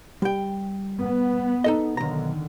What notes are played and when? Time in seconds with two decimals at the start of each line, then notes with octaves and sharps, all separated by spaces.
0.22 G3 G5
1.02 B3
1.64 D#4 A4 D#5
1.97 B1 D3 D#3 A#5